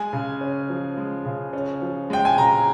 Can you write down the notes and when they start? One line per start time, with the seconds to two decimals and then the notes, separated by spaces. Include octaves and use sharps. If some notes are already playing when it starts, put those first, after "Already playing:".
Already playing: G#3 G#5
0.13 C#3
0.41 C#4
0.69 F3
0.97 G#3
1.25 C#3
1.53 C#4
1.82 F3
2.10 G#3 G5
2.25 G#5
2.38 C#3 A#5